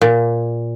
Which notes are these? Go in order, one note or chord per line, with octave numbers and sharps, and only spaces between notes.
A#2